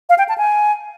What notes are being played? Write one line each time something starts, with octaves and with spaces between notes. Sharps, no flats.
F5
G5
A5
G#5